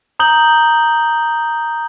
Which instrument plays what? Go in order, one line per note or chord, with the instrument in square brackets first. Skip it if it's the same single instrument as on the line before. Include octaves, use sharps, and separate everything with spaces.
[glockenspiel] A#5 D#6 G6 F#7 G7